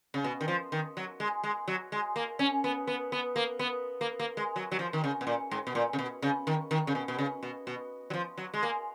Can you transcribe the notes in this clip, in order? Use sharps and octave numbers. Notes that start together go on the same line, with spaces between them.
C#3
B2
D#3
F3
D#3
F#3
G#3
G#3
F#3
G#3
A#3
C#4
B3
B3
B3
A#3
B3
A#3
A#3
G#3
F#3
F#3
F3
D#3
C#3
B2
A#2
G#2
B2
A#2
C#3
B2
C#3
D#3
D#3
C#3
B2
B2
C#3
B2
B2
F#3
F3
F#3
G#3
A#3